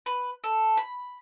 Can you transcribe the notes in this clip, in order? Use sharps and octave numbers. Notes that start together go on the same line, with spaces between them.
B4
A4
B5